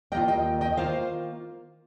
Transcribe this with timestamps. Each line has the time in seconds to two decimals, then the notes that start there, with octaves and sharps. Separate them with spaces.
0.12 D#2 D#3 A#3 F4 D#5 G5
0.28 D#5 G5
0.61 D#5 G5
0.77 D#3 A#3 F4 C5 F5